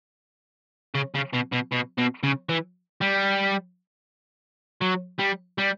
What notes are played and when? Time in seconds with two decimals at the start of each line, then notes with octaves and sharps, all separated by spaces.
0.95 C#3
1.14 C#3
1.33 B2
1.52 B2
1.72 B2
1.98 B2
2.23 C#3
2.49 E3
3.01 G3
4.81 F#3
5.19 G3
5.58 G3